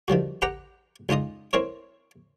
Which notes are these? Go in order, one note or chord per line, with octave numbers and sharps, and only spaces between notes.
D#3 F3 G3 F#4
G4 B4 F#5 G5 A#5
C#2 D#4 F4 D#5 D#6
C4 E4 A#4 C#5